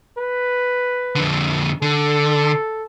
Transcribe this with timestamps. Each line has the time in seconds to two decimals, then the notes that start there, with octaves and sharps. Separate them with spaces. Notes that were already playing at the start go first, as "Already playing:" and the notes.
0.18 B4
1.15 F2 D3
1.82 D3 A4